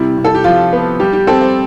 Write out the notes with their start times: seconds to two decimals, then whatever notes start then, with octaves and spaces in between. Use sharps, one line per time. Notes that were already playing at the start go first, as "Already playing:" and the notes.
Already playing: C3 G3 E4
0.18 C3
0.25 A4
0.35 G4
0.44 F3 F4
0.73 B3
1.00 G3 G4
1.13 G4
1.27 C4 A4
1.41 C5